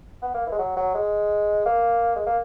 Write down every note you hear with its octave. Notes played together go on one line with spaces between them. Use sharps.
B3
A#3
E3
G#3
F#3
F#3
G#3
A#3
G#3
A#3